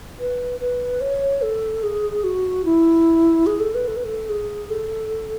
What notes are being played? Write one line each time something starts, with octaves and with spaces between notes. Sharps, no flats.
B4
B4
C#5
A4
G#4
F#4
E4
G#4
A4
B4
A4
B4
A4
G#4
A4